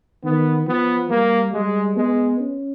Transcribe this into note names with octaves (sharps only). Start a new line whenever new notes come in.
D#3 B3
F3 B3
G3 A#3
G3 G#3
G#3 B3
C#4